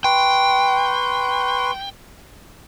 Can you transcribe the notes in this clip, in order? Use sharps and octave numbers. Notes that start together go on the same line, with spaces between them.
B4 G5 C6 C#6